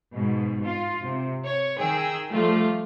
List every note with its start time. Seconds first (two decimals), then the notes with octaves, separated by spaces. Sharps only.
0.13 G#2 B2
0.64 F4
1.03 C3
1.45 C#5
1.77 D#3 G#4 G5 E6
2.29 F3 G3 A3 F4